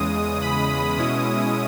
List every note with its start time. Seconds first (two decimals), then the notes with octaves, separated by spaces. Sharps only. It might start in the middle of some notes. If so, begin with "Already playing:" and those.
Already playing: E2 C#3 G#3 D#6
0.42 B5
0.98 B2 G#3 C#4 E4 D#6